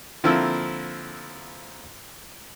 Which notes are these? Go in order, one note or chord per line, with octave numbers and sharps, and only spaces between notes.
D3 F3 A#3 C4 E4 E6